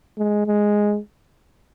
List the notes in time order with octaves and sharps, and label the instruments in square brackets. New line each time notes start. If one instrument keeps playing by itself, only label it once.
[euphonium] G#3
G#3